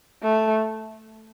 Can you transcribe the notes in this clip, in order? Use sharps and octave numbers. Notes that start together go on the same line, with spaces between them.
A3